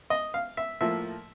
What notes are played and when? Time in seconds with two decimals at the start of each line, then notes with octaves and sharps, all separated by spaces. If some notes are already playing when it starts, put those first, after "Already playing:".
0.10 D#5
0.34 F5
0.57 E5
0.81 A2 F3 A#3 E5